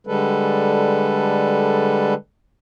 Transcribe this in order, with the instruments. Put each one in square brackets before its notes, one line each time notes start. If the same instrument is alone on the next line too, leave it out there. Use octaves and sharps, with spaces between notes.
[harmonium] D3 G3 G#3 A4 B4